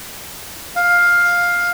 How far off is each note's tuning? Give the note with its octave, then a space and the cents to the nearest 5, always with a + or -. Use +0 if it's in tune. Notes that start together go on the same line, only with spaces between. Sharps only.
F5 +10